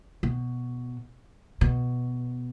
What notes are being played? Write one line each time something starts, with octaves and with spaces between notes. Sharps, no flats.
B2
B2